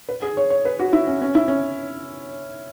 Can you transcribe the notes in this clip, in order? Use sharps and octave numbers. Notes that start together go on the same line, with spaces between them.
B4
G#4
C#5
C#5
B4
F#4
E4
C#4
C#4
E4
C#4